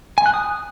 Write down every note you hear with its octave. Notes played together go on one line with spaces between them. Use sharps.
G#5
F#6
D#6